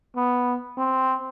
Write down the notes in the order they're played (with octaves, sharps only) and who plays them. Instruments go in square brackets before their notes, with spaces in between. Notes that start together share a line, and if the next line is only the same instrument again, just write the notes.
[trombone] B3
C4